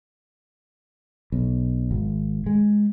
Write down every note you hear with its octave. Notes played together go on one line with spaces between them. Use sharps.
B1
G#1
G#3